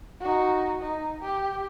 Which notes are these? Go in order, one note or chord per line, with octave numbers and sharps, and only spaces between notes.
D#4 F#4
D#4
G4